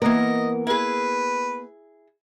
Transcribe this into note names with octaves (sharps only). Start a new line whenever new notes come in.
E3 A#3 B3 A#4 D#5
E4 G#4 B4